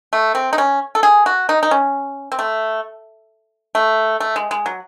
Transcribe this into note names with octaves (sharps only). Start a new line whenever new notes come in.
A3
C4
D#4
C#4
A4
G#4
F#4
D#4
D#4
C#4
C4
A3
A3
A3
G#3
G#3
F#3